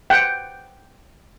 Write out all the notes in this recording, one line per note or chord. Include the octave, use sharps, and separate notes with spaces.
F#5 G5